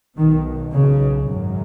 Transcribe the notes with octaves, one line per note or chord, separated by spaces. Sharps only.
B1 B2 D#3
C#3
G#1 F#2 C#3